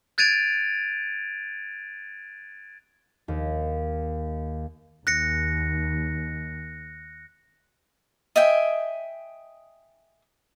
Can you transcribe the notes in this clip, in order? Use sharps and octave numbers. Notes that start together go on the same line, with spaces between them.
F#6 G#6 A6 D7 D#7 F7
D#2
D#2 F#6 A#6 C#7
D#5 E5 G5 G#5